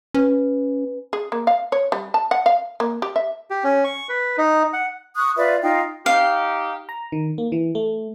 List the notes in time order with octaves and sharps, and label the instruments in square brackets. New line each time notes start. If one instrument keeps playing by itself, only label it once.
[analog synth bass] C#4 [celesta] B4
[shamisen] G#4
A#3
F5
C#5
G3
A5
F#5
F5
A#3
G4
E5
[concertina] G4
C#4
C#6
B4
D#4
F#5
[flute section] C#6 D#6 F#6
F4 B4 D5 E5
D#4 F4 G5
[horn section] D#4 G4 [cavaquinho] F5
[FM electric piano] A#5
D#3
A#3
E3
A3